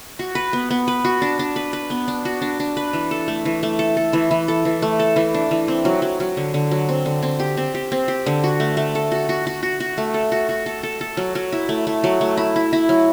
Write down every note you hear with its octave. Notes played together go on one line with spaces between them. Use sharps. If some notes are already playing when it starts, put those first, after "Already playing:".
F#4
B4
B3
B3
B4
F#4
D4
D4
B4
B4
B3
D4
F#4
D4
D4
B4
E3
A4
A3
E3
A3
A4
A4
E3
E3
A4
E3
A3
A4
E3
D4
E3
C4
F#3
F#3
F#3
D3
D3
F#3
C4
D3
C4
G4
C4
G4
C4
G4
D3
F#4
A3
A3
A4
F#4
F#4
F#4
F#4
F#4
A3
A4
F#4
F#4
A4
A4
A4
F#3
F#3
E4
A3
A3
F#3
A3
E4
E4
E4
F#3